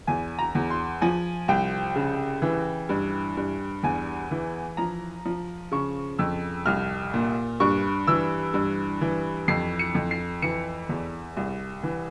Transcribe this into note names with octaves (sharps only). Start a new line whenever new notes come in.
E2 G#5
A#5
E2
C6
F3 G#5
C2 G5
C#3
E3
G2
G2
E2 G#5
E3
F3 A#5
F3
C#3 C#6
F2 E6
C2 F6
A#2
G2 C#6
E3 E6
G2
E3
F2 C7
C#7
F2
C7
E3 C#7
E2
C2
E3